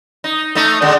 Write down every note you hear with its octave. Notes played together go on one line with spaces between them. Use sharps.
D#4
A3 D#4
A#2 D3 G#3